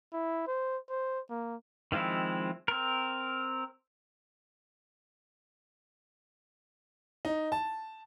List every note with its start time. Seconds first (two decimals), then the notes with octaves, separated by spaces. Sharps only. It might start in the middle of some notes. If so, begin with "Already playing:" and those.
0.13 E4
0.47 C5
0.90 C5
1.30 A#3
1.92 D#3 F3 G#3 C4 E4
2.68 C4 A#4
7.25 D#4
7.52 A5